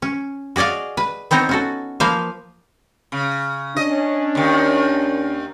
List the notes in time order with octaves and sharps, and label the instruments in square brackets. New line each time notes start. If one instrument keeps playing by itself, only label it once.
[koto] C#4
F#4 G#4 D5 D#5 F5
B4
B3 C4 D#4 C5 C#5
C#4 F#4 A4
F3 A#3 B4 C5 F5
[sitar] C#3
[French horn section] C#4 D4 [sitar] D#5
[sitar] D#2 D#3